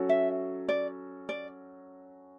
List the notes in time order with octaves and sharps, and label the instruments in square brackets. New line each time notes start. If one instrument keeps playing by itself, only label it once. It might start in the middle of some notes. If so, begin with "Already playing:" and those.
Already playing: [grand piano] F#3 C#4 F#4 A4
[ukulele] E5
D5
D5